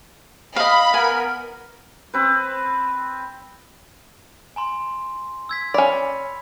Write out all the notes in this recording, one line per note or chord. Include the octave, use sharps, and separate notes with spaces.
D#5 F5 B5
B3 A#4 G#5
C4 B4
G#5 A#5 C6
E6 G#6 B6
C#4 D5 B5